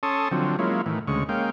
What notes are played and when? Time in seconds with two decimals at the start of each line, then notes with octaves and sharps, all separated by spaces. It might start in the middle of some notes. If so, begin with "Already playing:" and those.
0.03 C#4 A4 A5 C6 C#6 D#6
0.31 D3 F3 F#3 C4
0.59 F#3 G#3 A#3 C#4 E4 F4
0.86 A2 D#3 E3
1.07 D2 C#3 G#3 C#6
1.29 G#3 A#3 C#4 F5 G5